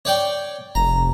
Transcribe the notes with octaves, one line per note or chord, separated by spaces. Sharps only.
C#5 D5 G5
F1 A#5